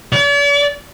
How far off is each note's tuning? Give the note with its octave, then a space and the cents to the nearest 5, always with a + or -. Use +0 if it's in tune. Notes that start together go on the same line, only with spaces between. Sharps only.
D5 -45